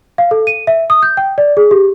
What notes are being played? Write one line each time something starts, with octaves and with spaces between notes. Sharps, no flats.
F5
A4
D#7
E5
D#6
G6
G5
D5
G#4
G4